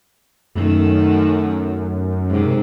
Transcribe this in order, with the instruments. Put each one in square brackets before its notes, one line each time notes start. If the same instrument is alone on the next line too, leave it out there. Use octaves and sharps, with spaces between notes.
[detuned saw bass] F#2 [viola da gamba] D#3 A3
[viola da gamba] G#2 C3